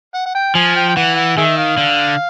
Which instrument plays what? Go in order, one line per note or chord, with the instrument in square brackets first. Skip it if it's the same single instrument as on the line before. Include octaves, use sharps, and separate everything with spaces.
[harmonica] F#5
F#5
G5
[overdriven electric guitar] F3 [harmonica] G#5
[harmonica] G5
G5
[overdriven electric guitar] E3 [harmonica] F#5
[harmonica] F#5
[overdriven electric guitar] D#3 [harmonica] G#4 E5
[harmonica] F5
[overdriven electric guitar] D3